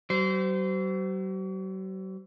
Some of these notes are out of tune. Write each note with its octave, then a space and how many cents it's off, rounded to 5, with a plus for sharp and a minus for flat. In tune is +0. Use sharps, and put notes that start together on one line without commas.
F#3 +45 C5 -25